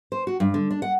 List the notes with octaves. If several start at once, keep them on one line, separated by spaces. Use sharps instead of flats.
C5
F#4
G2
D3
D4
F#5